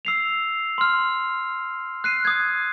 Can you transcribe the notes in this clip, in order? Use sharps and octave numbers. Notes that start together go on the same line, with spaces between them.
E6 C7 F7
C6 F6
F#6 C7 D#7
D#6 G#6